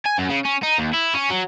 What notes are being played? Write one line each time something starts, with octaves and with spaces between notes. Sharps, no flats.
G#5
F#2
C#3
C#4
D#4
D#2
E4
C#4
F#3